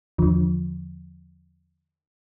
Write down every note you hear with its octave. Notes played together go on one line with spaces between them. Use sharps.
E2 D3 F3